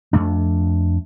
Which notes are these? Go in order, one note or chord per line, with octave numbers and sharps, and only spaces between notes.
F2 A3 D4